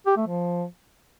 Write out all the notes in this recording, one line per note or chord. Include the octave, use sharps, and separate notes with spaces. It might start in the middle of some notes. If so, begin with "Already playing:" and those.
G4
A3
F3